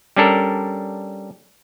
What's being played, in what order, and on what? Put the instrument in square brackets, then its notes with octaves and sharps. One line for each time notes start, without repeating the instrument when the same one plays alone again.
[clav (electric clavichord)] G3 C#4 D4 A4 A#4